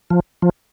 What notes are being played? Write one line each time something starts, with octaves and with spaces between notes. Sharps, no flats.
F3
F3